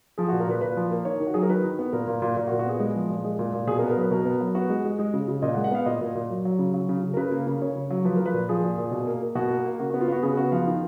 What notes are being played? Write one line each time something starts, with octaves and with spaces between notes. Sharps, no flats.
F3 G#4
F#4
A#2
A#4
A#2 B4
A#2 B4
F3
A#3
D#3 C#5
D#3
F#4
F#3 G#4
A#4
D#3 B4
D#3
B3
A#2 A#4
A#2
A#2
A#2 A#4
F#4
A#2
F#4
B3 G#4
G#3
F3
A#2
G#3
A#2
A#2
B2 G#4
A#4
B3
A#4
F#3 B4
B2 A#4
B3
F#3
B3 F#4
G#3
G#3
G#3 G#4
C#3
C#3
A#2 D#5
F#5
G#3
F#5
B3 F5
A#2 D#5
A#2
A#2
F#3
F#3
C#3
F#3
C#3
C#3
A#4
C#3 B4
A#3
C#3
C#3 C#5
C#3
F#3
F3 B4
F3 A#4
B4
A#2
F3 G#4
A#2
A#2
B2
A#3
A#3
B2 F#4
A#3
A#3
C#3 F#4
F#4
B3
F4
B3 F#4
C#3 G#4
B3 F#4
F3 F5
D#3